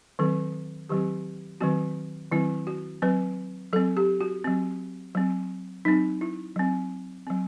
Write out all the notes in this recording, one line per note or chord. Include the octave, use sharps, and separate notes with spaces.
D#3 F#3 C4 A4
D#3 F#3 C4 G4
D#3 F#3 C4 F#4
D#3 F#3 C4 E4
F#4
F#3 C4 B4
F#3 C4 A4
G4
F#4
F#3 C4
F#3 C4
F#3 C4 D#4
E4
F#3 C4
F#3 C4